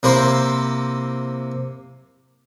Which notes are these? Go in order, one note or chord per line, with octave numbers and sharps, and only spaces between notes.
C3 A#3 E4 C5